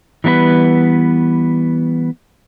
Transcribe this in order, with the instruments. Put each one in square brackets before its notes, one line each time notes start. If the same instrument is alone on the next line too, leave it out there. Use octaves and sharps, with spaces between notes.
[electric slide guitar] E3 G3 B3 D#4 B4